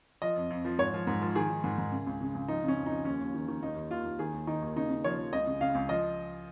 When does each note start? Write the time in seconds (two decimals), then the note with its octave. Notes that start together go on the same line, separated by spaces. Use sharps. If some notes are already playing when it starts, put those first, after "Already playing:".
0.22 F3 D#5
0.36 F2
0.50 F2
0.65 F3
0.78 G#2 C#5
0.94 F3
1.07 G#2
1.22 F3
1.35 D#3 G#4
1.50 D#3
1.64 G#2
1.78 G#2
1.92 C#3
2.07 C#2
2.21 C#3
2.35 C#2
2.48 F3 D#4
2.64 C#3 C#4
2.77 F2
2.86 D#4
2.92 F3
3.05 D#2 C#4
3.20 D#2
3.34 D#3
3.48 D#3
3.62 D#2 D#4
3.76 D#2
3.91 D#2 F4
4.06 D#2
4.19 D#3 G#4
4.33 D#2
4.47 D#3 D#4
4.62 D#2
4.76 C#3 D#4
4.90 C#3
5.04 F3 C#5
5.18 F3
5.33 C#2 D#5
5.47 C#3
5.61 C#3 F5
5.75 C#2
5.89 F3 D#5